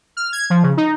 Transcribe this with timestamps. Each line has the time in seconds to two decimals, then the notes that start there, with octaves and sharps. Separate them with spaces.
0.17 F6
0.33 G#6
0.50 F3
0.63 C#3
0.77 D#4